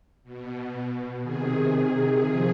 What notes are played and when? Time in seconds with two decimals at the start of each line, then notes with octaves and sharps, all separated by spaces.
0.24 B2
1.23 C3 D#3 G#4
2.22 F3